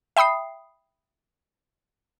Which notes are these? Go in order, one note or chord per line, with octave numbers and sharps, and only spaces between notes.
E5 G5 B5 D#6 C7